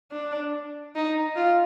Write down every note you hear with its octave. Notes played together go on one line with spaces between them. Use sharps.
D4
D#4
F4